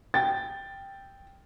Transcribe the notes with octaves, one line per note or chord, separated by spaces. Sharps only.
G5 A6